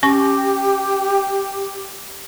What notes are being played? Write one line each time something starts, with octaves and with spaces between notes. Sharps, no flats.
C#4 G4 C#6